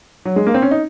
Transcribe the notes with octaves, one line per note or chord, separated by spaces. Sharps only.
F#3
G#3
A#3
C4
C#4
D#4